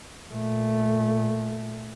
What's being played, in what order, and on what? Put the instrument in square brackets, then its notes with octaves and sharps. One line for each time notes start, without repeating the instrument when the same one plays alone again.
[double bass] A#2 A3